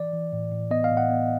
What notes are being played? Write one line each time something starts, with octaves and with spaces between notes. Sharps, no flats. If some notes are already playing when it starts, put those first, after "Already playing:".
Already playing: E3 D5
E3
A2
A2
B3 D#5
F5
A2
F#5
B3